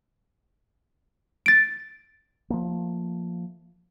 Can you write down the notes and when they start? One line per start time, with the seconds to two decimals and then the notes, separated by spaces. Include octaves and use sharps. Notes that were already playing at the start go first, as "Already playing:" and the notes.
1.46 A6 D7
2.50 F3 A3 A#3